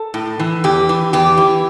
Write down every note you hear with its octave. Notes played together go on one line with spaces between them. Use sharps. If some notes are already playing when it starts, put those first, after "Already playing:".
Already playing: A4
A2
E3
E2 G4
E3
E2 G4
E3